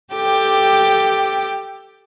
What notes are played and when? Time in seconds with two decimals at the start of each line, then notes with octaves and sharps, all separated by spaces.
0.13 G4 A4 G5 D6